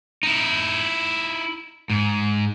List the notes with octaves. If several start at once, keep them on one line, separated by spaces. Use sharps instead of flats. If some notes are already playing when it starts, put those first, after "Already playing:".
D#4 E4
G#2